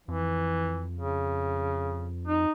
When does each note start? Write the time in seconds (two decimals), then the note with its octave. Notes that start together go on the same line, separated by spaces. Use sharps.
0.08 F2 E3
0.97 C#3
2.28 D#4